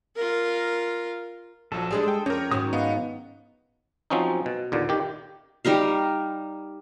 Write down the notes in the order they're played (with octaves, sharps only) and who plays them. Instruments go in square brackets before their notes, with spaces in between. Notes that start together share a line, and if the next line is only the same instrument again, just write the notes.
[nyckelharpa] F4 A#4
[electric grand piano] A#1 F3 F#3 [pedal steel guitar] A4
[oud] G3 G#3 D4 [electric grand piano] G#4 D5
[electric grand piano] G5 D#6
[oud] F2 [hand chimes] C#4 [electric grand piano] A#4 C#5
[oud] G#2 D#3 F#3 [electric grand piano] F#4 [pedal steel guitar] D#6
[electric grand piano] B3 [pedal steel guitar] D#5 F5 F#5
[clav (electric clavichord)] F3 F#3 C4 C#4 D#4
B2
D#2 A#2 D3
D#3 G4
[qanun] G3 D#4 A#4 F5